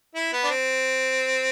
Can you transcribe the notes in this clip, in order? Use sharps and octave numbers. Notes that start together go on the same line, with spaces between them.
E4
B3
D4
C4